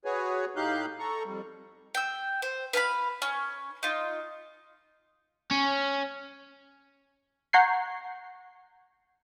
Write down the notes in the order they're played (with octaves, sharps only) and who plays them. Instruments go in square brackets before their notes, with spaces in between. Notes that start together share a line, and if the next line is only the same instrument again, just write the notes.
[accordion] F#4 G#4 B4 C#5 G#5
A2 D#4 G4 F5 F#6 G6
A4 A#5 C#6
F2 G3
[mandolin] G5 E6
C5
B4 F5 G#5 B5
C#4
D#4 F4
[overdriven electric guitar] C#4
[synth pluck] F#5 A#5 C#6 G6 G#6 C7